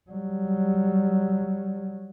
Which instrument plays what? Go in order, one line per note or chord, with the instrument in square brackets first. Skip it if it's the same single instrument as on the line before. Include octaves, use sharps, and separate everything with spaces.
[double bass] F#3 G3